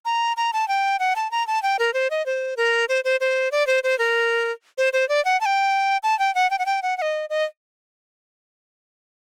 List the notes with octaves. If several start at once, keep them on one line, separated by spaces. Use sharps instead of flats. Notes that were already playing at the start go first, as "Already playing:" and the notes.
A#5
A#5
A5
G5
F#5
A5
A#5
A5
G5
A#4
C5
D#5
C5
A#4
C5
C5
C5
D5
C5
C5
A#4
C5
C5
D5
F#5
A5
G5
A5
G5
F#5
G5
F#5
G5
F#5
F#5
D#5
D#5